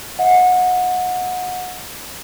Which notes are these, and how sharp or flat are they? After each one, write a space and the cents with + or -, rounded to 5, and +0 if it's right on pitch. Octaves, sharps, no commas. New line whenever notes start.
D#5 +35 F#5 -25